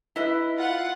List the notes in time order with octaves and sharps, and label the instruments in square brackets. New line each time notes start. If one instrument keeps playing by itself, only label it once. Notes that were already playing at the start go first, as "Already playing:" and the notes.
[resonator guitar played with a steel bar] E4 B4 D#5
[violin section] F4 F#5